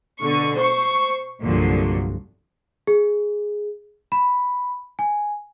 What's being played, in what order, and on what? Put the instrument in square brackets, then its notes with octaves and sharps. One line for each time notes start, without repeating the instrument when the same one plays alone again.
[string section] B2 D3 C#6
C5 C#6
C2 G2 A#2 D3 F3 F#3
[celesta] G#4
B5
G#5